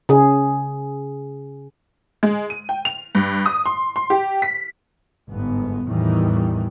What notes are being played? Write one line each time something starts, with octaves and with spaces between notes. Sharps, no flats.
C#3 G#4
G#3
D#7
G5
F7
G2
D#6
C6
C6
G4
B6
G1 G#2 B3
E2 A2 D#3 E3 G3